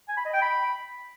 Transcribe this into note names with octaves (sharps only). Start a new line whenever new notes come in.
G#5
B5
D#5
G5
B5